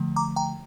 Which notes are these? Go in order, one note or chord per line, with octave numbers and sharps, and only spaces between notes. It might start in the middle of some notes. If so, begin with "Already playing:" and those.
Already playing: D3 F3 A3
A#5 D6
G5 A#5